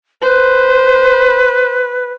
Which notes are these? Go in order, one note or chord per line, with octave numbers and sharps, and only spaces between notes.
B4 C5